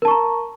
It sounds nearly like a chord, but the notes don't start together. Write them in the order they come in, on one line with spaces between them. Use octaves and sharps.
A#4 A5 C#6 A#5